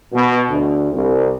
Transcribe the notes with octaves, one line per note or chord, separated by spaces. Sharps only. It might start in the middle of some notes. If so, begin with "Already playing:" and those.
B2
D2
C2